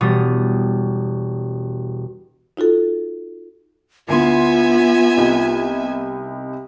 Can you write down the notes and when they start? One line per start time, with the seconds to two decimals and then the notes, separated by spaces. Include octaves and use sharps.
0.01 E1 B2 G3 D#6
2.57 D#4 F4 F#4 A4
4.09 D2 B3 E4 F4 E5 G#5 C6
5.17 C2 D#4